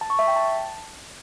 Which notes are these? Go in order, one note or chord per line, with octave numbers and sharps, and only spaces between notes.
A5
C#6
E5
G5
A5